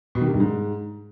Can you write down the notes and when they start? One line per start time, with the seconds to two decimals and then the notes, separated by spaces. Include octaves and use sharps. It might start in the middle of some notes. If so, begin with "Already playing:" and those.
0.15 B2
0.21 D#3
0.28 C3
0.34 G2
0.40 G#2